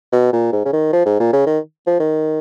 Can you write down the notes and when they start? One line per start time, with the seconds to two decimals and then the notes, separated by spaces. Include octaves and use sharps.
0.13 B2
0.33 A#2
0.52 G#2
0.66 C#3
0.73 D#3
0.93 F3
1.06 G#2
1.20 A#2
1.33 C#3
1.47 D#3
1.87 F3
2.00 D#3